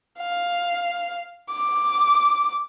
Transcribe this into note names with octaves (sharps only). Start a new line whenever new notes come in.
F5
D6